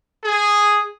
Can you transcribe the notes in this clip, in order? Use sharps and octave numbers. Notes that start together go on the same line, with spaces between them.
G#4